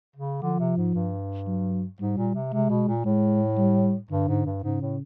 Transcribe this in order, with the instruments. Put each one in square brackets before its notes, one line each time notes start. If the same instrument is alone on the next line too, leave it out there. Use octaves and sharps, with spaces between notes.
[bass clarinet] C#3
[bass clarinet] D3 [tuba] F3
[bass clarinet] C3
G#2
G2
[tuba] F#3
[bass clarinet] G#2 [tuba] G3
[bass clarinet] A#2
C3
[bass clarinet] C3 [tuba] G#3
[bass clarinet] B2
A#2
[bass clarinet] A2 [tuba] G#3
[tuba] G3
[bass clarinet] G2 [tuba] D3
[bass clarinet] G#2
G2
[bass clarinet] G#2 [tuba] C#3
[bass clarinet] A2